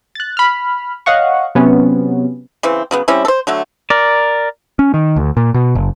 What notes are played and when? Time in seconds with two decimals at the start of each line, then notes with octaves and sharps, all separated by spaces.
0.15 F#6 A6
0.37 B5 F6
1.06 C#5 D#5 F5 F#5 C#6
1.55 C3 F#3 B3 C#4
2.63 C#3 E3 C4
2.91 C#3 F#3 B3
3.08 G3 C4 C#4 E4
3.25 A4 C5
3.47 D3 F#3 A3
3.90 A#4 D5
4.79 C#4
4.94 D#3
5.16 D2
5.37 A#2
5.54 B2
5.75 F#1